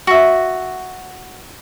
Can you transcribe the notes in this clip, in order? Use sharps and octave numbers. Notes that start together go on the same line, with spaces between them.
F#4 E5